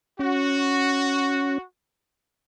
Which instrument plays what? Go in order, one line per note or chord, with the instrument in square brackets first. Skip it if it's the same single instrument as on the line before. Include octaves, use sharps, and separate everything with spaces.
[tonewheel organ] C#4 [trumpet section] F#4